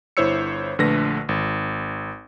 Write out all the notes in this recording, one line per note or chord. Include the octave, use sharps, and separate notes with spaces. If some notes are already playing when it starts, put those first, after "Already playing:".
G1 E4 C5 C#5 E6 C#7
A#1 D3 A3 B4 A#6
G#1